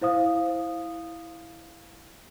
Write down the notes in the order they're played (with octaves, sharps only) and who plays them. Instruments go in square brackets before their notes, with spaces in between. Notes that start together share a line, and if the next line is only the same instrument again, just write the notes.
[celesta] E4 C5 F5 D#6